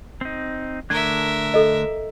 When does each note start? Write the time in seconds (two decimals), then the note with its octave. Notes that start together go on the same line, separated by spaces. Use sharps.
0.21 C4 D#4
0.90 D3 A3 D4 A#4 E5 G#6
1.54 A4 D#5